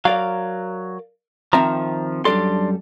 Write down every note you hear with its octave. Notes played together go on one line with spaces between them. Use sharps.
F#3 A#4 D5 F5
D#3 F3 C4 E5 A#5
F#2 G3 D4 A4 D5 C6